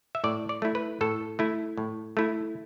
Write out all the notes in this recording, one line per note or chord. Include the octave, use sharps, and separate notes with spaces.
E5
A2 D5
D5
A3 E4
B4
A2 A4
A3 E4
A2
A3 E4